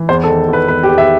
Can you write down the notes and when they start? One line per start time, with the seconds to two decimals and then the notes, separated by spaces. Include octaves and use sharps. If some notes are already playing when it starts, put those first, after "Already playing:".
Already playing: E3
0.09 E2 C5
0.24 A4
0.28 D#3
0.48 E2 B4
0.68 E2 B4
0.83 G4
0.89 E2
0.98 E5